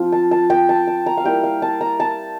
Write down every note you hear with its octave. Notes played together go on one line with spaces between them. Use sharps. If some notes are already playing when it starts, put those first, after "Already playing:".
Already playing: F3 C4 F4
A5
A5
G5
A5
A5
A#5
F5
G3 A#3 E4 G5
F5
A5
A#5
A5